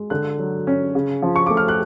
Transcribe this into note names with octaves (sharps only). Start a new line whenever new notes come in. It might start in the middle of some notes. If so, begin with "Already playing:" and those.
Already playing: G#3
D3 F#6
F#3
C#4
C#3
F3
C#6
A3 D6
F6
F#6